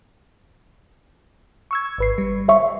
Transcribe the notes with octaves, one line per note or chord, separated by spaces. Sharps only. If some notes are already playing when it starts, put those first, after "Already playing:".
C#6 E6 G#6
G#1 B4 C7
G3
C5 E5 C#6